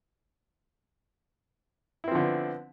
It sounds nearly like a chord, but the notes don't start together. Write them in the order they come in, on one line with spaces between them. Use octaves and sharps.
E4 C4 F3 D3 B3